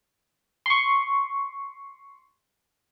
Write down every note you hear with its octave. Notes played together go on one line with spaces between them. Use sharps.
C6 C#6